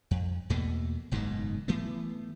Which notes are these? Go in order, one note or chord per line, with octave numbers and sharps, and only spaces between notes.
F2
E2 B2 A3 A#3
F#1 G#2 B2 D#3
E3 A3 B3